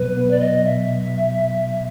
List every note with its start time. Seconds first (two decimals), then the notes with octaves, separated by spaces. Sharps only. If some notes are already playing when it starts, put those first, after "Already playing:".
Already playing: B2 F#3 B3 B4
0.17 B3
0.31 D5
0.40 F#3 D#5
0.64 B2 E5